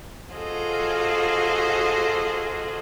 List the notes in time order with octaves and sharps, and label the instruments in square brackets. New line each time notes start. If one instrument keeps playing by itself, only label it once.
[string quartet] F4 F#4 G#4 A4 C5 D#5